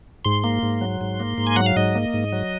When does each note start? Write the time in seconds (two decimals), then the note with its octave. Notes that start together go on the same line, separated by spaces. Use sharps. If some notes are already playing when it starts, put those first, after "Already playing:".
0.25 G#2 C6
0.44 A#3
0.63 G#2
0.81 F#3
1.01 G#2
1.20 A#3
1.38 G#2
1.47 G#5
1.56 F#3 F#5
1.66 F5
1.76 G#2 D#5
1.95 A#3
2.14 G#2
2.33 F#3